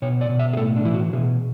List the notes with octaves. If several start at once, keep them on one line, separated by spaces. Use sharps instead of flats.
B2 C#5
D5
B2
E5
G#4
A2 A4
D4
E3 E4
F#4
B2 G#4